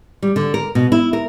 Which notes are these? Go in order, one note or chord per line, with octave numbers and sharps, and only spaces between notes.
G3
D3
A#4
B2
E4
A#4